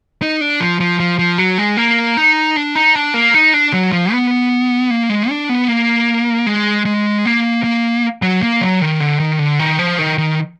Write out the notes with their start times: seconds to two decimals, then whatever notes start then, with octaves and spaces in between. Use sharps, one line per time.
0.22 D#4
0.41 D4
0.60 F3
0.80 F3
1.00 F3
1.19 F3
1.38 F#3
1.58 G#3
1.77 A#3
2.17 D#4
2.57 D4
2.75 D#4
2.95 D4
3.14 A#3
3.34 D#4
3.54 D4
3.73 F#3
3.92 F3
4.12 B3
4.91 A#3
5.10 G#3
5.30 D4
5.49 B3
5.68 A#3
6.46 G#3
6.86 G#3
7.25 A#3
7.64 A#3
8.22 F#3
8.43 A#3
8.61 F#3
8.81 D#3
9.00 D3
9.20 D#3
9.39 D3
9.59 D#3
9.79 F3
9.99 D#3
10.18 D#3